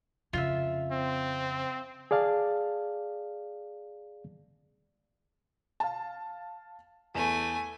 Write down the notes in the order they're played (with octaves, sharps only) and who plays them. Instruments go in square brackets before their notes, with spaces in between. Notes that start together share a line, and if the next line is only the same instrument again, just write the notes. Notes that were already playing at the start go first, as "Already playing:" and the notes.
[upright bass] F2 C#3 [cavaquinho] F4 E5
[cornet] C4
[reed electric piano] G#4 D5 F5 A5
[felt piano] F5 A5
[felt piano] E2 [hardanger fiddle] A3 G#5